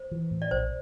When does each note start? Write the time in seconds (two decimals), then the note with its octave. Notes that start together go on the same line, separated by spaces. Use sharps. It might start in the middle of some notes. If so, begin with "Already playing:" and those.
Already playing: C5
0.11 E3
0.31 A2
0.42 D5
0.51 A#1 C5